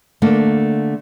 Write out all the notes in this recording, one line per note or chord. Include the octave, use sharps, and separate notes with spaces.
D3 A3 A#3